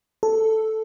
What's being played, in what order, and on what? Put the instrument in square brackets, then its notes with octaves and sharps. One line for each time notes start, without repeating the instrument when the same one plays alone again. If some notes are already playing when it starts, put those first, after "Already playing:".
[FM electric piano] A4